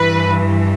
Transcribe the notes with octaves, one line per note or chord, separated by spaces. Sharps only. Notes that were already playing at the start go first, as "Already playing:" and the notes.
Already playing: G2 E3 B4